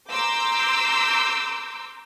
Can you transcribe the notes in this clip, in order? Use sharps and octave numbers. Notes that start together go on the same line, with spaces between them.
A#5 C6 D6 E6 G6